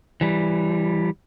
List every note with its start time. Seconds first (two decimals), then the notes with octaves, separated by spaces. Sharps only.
0.21 E3 G3